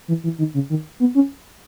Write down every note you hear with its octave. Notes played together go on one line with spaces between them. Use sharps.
E3
E3
D#3
C#3
D#3
B3
C#4